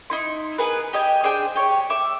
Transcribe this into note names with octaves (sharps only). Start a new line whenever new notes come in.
D#4 E4 C6
B3 G#4 A#4 B4
G4 D#5 G#5
D4 G#4 C5 G5
G4 C#5
E5 D6